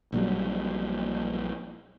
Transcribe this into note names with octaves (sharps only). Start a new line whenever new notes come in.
A#1 A#2 F#3 G3